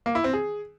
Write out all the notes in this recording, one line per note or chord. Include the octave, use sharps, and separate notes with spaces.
A#3
E4
C4
G#4